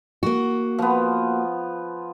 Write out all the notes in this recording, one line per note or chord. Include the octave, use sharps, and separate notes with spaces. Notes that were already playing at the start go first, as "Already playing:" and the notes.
A#3 F#4
F3 B3